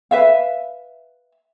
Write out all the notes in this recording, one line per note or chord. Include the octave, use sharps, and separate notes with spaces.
B4 E5 F5